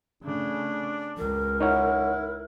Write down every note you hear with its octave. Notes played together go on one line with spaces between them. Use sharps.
C#3 A3 D4
C#2 A#4
D#4 E4 C#5 F#5